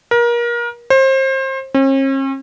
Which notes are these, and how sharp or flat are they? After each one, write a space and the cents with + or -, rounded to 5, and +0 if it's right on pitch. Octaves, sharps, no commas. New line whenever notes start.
A#4 +30
C5 +30
C#4 -45